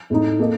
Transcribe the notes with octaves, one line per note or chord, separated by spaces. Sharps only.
A2 A3 D#4
A#3 D#4 A4 D#5